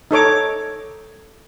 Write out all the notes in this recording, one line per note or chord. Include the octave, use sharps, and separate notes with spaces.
D#4 A4 C#5 D6